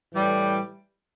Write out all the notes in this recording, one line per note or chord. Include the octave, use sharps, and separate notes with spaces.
A2 E3 G3